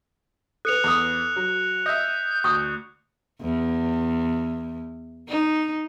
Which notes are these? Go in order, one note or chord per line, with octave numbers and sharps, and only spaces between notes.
A4 B4 F#6 C#7 F7
E2 B5 D#6
F#3
D#5 E5 G6
D2 C#6 D#6
E2
D#4